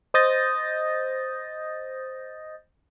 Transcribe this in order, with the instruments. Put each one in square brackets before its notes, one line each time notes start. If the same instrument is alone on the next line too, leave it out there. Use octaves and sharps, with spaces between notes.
[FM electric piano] C5 D#5 D#6 G6 A6 A#6